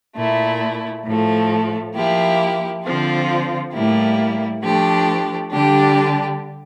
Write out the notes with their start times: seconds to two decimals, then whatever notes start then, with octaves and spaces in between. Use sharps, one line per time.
0.16 A#2 A3 E4
1.05 A2 F3 A3
1.95 F3 A#3 E4 G4
2.85 D3 F3 C4 F4
3.74 A2 G3 A#3 E4 G4
4.63 F3 A3 D4 G4
5.52 D3 G3 D4 G4